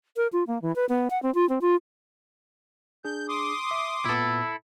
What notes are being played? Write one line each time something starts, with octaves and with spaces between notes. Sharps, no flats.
A#4
F4
A#3
E3
B4
B3
F#5
C4
F4
C4
F4
D4 G#4 G6
C6 D6 D#6
E5
A#2 B3 E4 A4